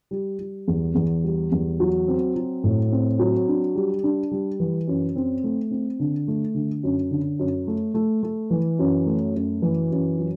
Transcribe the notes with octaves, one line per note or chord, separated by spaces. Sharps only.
G3
G3
E2
E2
G3
E2
F#3
C4
F#3
A2
C4
F#3
D4
G3
D4
G3
E3
F#2
C4
A3
C4
D3
A3
D3
F#2
D3
F#2
A3
A3
A3
E3
F#2
A3
F#2
E3
F#2
F#3